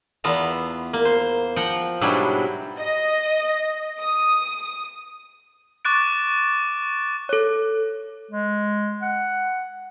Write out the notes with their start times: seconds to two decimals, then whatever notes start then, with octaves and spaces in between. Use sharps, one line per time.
0.24 E2 B3 F4 A5 A#5
0.93 A#3
1.05 C5
1.56 F3 F4 F#5 G5 A#5
2.01 G#2 B2 F#3 G3 D4 E4
2.79 D#5
3.99 D#6
5.85 C#6 D6 F#6 A6 D7
7.29 A4 C#5
8.31 G#3
9.02 F#5